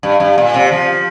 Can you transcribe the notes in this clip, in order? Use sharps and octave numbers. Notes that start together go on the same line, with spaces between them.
G2
G2
A#2
C3
F3